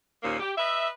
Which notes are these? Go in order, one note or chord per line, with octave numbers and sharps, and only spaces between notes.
D#2 A#2 A#3 C#4 C5
G4
B4 D#5 E5